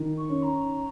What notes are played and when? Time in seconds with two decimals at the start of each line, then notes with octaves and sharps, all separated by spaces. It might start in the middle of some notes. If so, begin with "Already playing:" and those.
Already playing: D#3
0.17 C#6
0.29 C#4
0.42 A#5